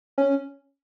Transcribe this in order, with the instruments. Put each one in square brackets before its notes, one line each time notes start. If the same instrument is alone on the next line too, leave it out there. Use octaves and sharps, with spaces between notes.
[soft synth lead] C#4